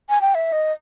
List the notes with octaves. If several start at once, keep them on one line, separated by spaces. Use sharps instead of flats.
G#5
G5
E5
D#5